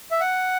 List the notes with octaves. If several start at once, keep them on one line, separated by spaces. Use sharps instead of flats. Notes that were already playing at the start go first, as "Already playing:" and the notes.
E5
F#5